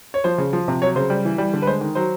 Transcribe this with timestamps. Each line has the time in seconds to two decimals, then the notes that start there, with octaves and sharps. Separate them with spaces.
0.14 C#5
0.24 F3 C5
0.38 C#3
0.53 F3
0.68 C3
0.82 F#3 C#5
0.96 C#3 C5
1.10 G3
1.25 E3
1.38 G3
1.54 D3
1.62 B4
1.67 G#3 C5
1.81 D#3
1.95 F#3 C5